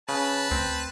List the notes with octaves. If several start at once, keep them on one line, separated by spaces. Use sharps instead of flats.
C#3 B4 A5
D2 C4